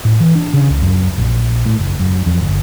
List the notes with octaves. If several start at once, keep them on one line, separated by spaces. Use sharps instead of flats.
A2
E3
D4
C#3
C#2
F#2
A#1
A2
F#1
F#2
F2
G1